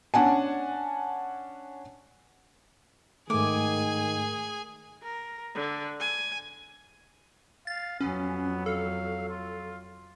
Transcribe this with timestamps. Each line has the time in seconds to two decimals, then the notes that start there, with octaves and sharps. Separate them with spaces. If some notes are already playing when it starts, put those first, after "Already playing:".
0.14 C#4 D4 F#5 G#5 A5
3.30 G#2 D#3 A3 G#4 G#5 D6
5.03 A#4
5.54 D3
6.00 G#5
7.67 F5 A6
8.01 F2 F#3 B3 C#4
8.66 A4 F5
9.30 F4